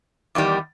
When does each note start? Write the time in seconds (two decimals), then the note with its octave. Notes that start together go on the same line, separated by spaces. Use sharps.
0.35 E2 D#3 G3